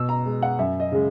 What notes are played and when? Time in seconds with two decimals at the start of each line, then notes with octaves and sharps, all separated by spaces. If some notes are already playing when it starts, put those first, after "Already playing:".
Already playing: B2 E6
0.09 A#5
0.26 G#3
0.42 F#5
0.59 F#2 E5
0.80 D#5
0.92 C#3 G#3